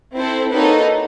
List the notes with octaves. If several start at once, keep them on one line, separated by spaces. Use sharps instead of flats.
C4 E4 A4 C5
A#3 D#4 F#4 A4 B4 C#5